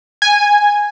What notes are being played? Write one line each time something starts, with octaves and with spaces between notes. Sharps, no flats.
G#5